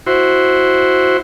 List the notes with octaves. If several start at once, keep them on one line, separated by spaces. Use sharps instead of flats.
E4 F#4 C5